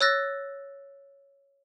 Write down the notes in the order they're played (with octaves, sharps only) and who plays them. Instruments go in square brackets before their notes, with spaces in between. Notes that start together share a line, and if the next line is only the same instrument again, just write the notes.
[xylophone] C#5 E6 F#6 A6 A#6